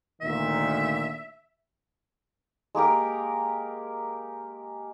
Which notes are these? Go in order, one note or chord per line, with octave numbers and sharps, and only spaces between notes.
D2 A#2 D#3 E5
G#3 A#3 G4 A#4